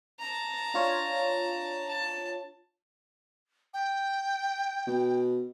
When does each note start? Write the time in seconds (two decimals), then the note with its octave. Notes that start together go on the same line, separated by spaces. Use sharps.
0.20 A5 A#5
0.74 D4 F4 C#5
1.89 A5
3.74 G5
4.87 B2